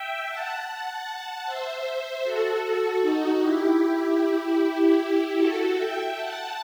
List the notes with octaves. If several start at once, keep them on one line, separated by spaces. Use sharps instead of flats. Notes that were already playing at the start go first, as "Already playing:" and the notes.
Already playing: E5 G5
F#5 A5
F#5 A5
C5 E5
F#4 A4
D#4 F#4
E4 G4
F#4 A4
E5 G5
F#5 A5